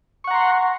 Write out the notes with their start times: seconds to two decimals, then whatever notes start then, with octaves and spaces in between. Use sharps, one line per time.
0.24 C#6
0.27 F#5
0.31 A#5
0.34 C6